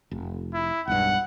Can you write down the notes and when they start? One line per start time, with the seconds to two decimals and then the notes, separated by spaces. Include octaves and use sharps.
0.11 F1
0.54 E4
0.87 E1 B1 G2 F#5